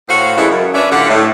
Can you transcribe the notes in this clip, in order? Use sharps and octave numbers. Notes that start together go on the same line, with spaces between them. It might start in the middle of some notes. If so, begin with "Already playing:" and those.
A2 F#4 C5 C#5 F5
C#3 E3 F3 G#3 E4 A4
F#2
C#4 D4 B4 D5 E5
A2 D3 F4 G4 F#5
A2